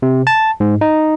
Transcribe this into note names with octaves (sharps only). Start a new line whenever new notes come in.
C3
A5
G#2
D#4